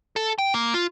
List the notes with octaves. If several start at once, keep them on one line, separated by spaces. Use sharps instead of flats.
A4
G5
A#3
F4